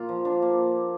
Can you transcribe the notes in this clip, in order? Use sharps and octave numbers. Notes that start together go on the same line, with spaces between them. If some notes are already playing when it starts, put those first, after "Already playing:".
Already playing: A#2 A#3 F4
F3
D4
A#3